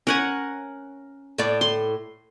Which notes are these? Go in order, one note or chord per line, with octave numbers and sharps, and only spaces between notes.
C#4 A#4 F#5 G#5
A2 D5
C6